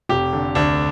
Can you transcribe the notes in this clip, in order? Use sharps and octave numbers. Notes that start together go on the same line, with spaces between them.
F1 G4
D3
D2 D4